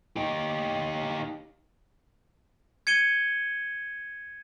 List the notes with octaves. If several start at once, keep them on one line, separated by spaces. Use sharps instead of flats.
D#4 G4
G#6 C#7 D#7 G7